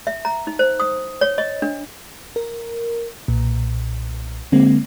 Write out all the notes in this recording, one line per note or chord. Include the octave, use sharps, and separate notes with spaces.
E5
A#5
D#4
C5
D#6
C#5
D#5
D4
A#4
B1 A#2
D3 G#3 A#3 C4